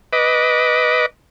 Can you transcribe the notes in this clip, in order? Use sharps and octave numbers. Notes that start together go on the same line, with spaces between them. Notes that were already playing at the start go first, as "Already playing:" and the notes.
B4 D#5 D6